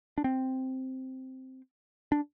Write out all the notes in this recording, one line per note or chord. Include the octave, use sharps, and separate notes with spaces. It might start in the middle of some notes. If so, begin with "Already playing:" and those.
D4
C4
D4